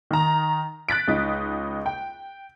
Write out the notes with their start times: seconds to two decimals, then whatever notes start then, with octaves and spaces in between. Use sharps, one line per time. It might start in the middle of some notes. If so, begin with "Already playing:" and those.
0.11 D#3 A#5
0.89 F#6 A6 B6 D7
1.08 C#2 D#4
1.86 G5